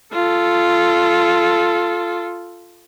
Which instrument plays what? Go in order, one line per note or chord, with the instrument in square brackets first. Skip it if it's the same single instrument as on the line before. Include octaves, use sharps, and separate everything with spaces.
[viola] F4 A4